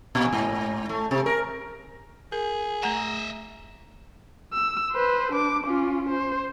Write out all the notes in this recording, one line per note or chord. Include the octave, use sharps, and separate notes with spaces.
A#2
G#2
A3
C3
A#4
G#4 A#4
A3 D#5 E5 F#5 A#5
E6
B4 C5
D4 D6
C#4 F4
C5